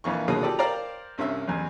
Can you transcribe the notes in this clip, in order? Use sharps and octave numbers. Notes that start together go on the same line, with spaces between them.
A#1 F2 E3 C#6
D#2 B2 D3 F#3 G#4
F4 G4 A4 D5
A#4 C5 D5 F5 G5 A#5
C2 G2 C3 C#4 E5
A1 E2